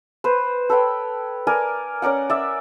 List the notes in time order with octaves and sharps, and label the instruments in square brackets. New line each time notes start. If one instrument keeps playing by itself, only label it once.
[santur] B4 C5
A4 B4 C#5 G5
A#4 D5 G#5
C#4 A#4 D5 F#5
D5 E5